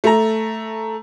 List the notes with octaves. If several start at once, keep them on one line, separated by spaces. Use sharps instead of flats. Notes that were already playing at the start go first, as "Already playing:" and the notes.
A3 A#5